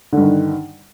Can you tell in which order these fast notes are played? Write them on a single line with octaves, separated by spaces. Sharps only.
D3 G2 D#3